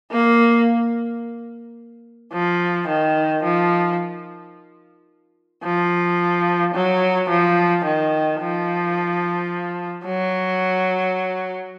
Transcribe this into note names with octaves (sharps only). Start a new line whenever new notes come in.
A#3
F3
D#3
F3
F3
F#3
F3
D#3
F3
F#3